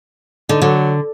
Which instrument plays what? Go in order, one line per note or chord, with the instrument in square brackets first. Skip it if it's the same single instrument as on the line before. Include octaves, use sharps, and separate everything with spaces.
[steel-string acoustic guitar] D3 [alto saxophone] D#4
[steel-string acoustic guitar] D3 [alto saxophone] F#3